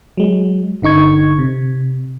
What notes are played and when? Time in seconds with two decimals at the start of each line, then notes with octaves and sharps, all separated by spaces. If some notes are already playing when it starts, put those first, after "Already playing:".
0.17 F#3 G#3
0.82 G1 D3 D#4 C#6 G#6
1.39 C3